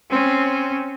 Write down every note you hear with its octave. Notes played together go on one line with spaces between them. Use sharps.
C4 C#4